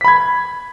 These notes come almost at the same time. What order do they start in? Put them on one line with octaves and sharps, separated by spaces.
B6 B5 G#6